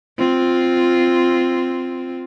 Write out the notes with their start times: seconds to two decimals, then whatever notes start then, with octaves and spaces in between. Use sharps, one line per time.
0.18 C4 F4